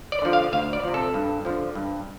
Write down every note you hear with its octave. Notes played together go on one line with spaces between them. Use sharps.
D5
D3 F3
F5
D2 F5
D5
C3 F3
A4
G2
D3 F3
G2